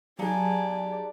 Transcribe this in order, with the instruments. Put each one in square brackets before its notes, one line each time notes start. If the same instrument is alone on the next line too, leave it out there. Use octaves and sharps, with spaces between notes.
[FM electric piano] F#3 G#4 [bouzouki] D4 D#4 F5 [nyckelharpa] G4 D5 [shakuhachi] G#5